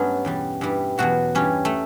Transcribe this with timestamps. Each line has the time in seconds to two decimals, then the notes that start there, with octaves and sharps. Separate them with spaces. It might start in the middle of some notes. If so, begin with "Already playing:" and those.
Already playing: G2 F#3 A3 B3 C#4
0.25 E2 B2 G3
0.61 G2 E3 G3
0.98 E2 B2 F#3 F#4
1.35 G2 E3 G3 C#4
1.65 A3